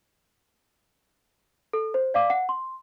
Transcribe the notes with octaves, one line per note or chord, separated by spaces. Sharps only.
A4
C5
D5 F5 D6
F#5
C6